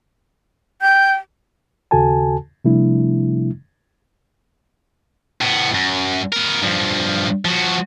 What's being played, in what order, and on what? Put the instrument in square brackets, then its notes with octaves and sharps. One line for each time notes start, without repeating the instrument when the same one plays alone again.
[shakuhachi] G5 [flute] G6
[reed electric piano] D#2 C#3 F#4 A4 G#5 A5
C3 F3 G3 A3 D4 E4
[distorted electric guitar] A2 B3
F#2
B3 A#4
G2 F3
F3 F#4